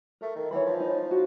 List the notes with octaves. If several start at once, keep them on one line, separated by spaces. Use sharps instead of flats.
A3 A#4
D#3
E3 C#5 F#5 B5
F3
D#4
F#4